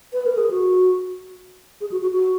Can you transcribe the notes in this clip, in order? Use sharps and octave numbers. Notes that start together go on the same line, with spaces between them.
B4
A#4
G#4
F#4
G#4
F#4
F#4
F#4